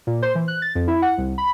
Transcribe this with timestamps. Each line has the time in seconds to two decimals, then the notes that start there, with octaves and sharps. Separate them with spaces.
0.07 A#2
0.22 C5
0.35 E3
0.48 F#6
0.62 A6
0.75 F2
0.88 E4
1.02 F#5
1.18 C2
1.38 B5